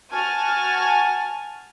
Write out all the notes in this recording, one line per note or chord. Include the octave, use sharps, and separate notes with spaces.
F#4 G#5 A5 F6